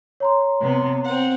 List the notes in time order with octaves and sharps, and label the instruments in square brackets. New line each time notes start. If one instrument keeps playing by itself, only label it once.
[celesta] C#5 A#5 C6
[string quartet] C3 B3
C4 F#5